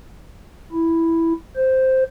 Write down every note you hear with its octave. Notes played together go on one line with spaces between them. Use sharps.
E4
C5